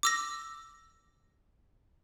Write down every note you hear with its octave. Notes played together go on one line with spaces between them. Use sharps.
D6 E6 A#6